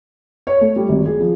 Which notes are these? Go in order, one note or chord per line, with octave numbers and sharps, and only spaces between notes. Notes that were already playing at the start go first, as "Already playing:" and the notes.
C#5
A3
G3
G#1
G#4
F3